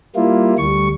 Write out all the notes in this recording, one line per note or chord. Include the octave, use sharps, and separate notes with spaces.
G3 A#3 E4 F4
D2 G3 C#6